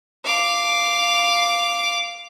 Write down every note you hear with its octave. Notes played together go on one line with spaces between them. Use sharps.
F5 D6